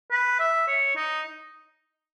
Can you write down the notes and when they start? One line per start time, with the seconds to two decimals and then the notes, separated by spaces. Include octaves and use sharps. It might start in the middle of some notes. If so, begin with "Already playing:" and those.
0.11 B4
0.39 E5
0.68 C#5
0.96 D#4